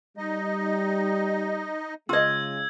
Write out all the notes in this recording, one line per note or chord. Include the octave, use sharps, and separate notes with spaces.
G3 D#4 D#5
C#3 G#3 F4 D#5 E6 G#6